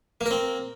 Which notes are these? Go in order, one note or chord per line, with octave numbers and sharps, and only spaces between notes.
A#3 C4 A#4